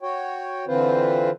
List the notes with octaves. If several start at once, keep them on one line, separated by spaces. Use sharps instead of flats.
F#4 C#5 G5
D3 E3 C4 F4 B4 C5